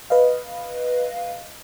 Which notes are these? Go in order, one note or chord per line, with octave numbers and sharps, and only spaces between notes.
B4 D#5 F5